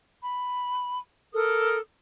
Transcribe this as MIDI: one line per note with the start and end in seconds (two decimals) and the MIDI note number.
0.22 0.98 83
1.33 1.77 69
1.33 1.77 70
1.33 1.77 87